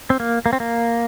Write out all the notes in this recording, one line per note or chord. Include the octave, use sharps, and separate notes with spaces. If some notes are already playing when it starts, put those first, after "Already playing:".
C4
A#3
A#3
C4
A#3